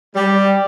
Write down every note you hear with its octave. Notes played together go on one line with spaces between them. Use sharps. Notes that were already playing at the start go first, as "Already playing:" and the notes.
G3